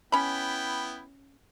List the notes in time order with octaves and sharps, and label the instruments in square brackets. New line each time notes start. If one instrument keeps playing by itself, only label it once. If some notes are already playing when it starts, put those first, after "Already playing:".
[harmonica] B3 E4 G5 [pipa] C#4 B5